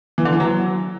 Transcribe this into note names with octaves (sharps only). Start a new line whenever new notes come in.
E3
D3
E3
F#3